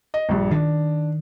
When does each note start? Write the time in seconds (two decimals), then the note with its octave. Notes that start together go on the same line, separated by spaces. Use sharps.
0.14 D#5
0.29 A#1 G2
0.51 D#3 D4